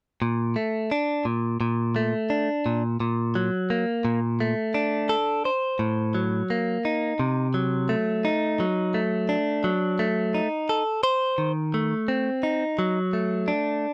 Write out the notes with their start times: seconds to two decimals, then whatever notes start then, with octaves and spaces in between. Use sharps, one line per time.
0.22 A#2
0.56 A3
0.91 D4
1.25 A#2
1.61 A#2
1.96 A3
2.30 D4
2.66 A#2
3.00 A#2
3.35 F#3
3.70 A#3
4.05 A#2
4.40 A3
4.74 D4
5.09 A4
5.45 C5
5.79 A2
6.15 F#3
6.50 A#3
6.85 D#4
7.19 C3
7.54 F#3
7.89 A3
8.25 D#4
8.60 F#3
8.94 A3
9.29 D4
9.64 F#3
9.99 A3
10.34 D#4
10.69 A4
11.03 C5
11.38 D#3
11.74 A3
12.08 C4
12.43 D#4
12.79 F#3
13.13 A3
13.48 D4